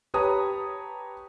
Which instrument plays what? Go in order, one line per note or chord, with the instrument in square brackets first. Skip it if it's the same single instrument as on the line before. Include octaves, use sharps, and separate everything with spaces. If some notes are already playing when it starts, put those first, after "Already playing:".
[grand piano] G4 B4 C#5 A5 A#5 D#6